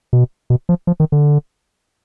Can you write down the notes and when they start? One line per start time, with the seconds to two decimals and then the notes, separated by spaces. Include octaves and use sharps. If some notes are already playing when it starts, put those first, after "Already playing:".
0.13 B2
0.50 B2
0.69 F3
0.87 F3
1.00 D#3
1.12 D3